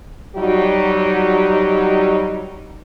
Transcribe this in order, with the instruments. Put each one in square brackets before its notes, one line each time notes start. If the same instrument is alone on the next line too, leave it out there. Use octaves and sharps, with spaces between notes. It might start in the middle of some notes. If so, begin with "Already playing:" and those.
[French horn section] F#3 G3 D#4 F#4 G4